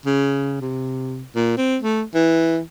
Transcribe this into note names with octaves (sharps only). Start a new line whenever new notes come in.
C#3
C3
A#2
C4
A3
E3